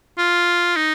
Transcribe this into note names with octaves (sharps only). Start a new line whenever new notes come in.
F4
D#4